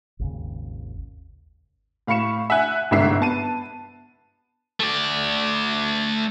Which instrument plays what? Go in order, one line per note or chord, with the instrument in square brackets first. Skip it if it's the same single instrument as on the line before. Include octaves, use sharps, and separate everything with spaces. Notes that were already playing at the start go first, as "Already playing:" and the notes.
[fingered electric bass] G#1 D#2 C#3
[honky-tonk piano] A2 F5 B5 C#6 C#7 E7
E5 F#5 G#5 F#6
G1 C2 G#2 E5 C7
B3 A5 D#7
[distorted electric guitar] A3 D5